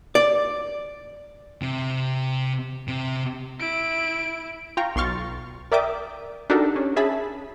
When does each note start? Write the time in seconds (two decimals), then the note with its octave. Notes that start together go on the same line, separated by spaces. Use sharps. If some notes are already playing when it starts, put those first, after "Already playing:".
0.15 D5
1.62 C3
2.88 C3
3.60 E4 D7
4.77 F4 G5 A#5 C#6
4.96 B1 C6 C#6 F6 A6
5.72 A#4 D5 E5 G5 D6 D#6
6.50 D4 D#4 F#4 G4 A4 A#4
6.76 C#4
6.96 C#4 G#4 E5 A5 B5